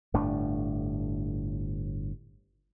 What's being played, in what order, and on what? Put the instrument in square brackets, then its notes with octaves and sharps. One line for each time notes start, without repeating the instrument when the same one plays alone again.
[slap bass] G1 A2 A3 D4